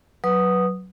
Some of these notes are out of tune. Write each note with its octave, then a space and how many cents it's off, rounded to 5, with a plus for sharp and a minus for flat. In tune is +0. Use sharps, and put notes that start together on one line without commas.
F#3 +0 B4 +0 D#6 -5